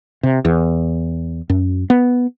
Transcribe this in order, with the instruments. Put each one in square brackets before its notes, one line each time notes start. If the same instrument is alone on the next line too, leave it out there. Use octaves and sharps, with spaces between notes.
[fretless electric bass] C3
E2
F#2
B3